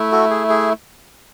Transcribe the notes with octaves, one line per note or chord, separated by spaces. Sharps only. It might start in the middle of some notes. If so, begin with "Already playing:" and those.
Already playing: A3 E4
F#4 A4
G#4
G#4